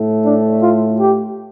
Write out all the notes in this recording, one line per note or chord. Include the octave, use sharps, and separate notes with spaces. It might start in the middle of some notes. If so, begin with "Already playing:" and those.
Already playing: A2 A3
D4
F4
G4